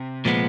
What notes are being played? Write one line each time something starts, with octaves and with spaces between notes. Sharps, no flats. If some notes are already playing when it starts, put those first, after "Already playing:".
Already playing: C3
A#2 F3 G#3 B3